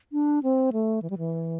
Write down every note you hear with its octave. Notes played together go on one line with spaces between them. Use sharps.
D4
C4
A3
E3
G3
E3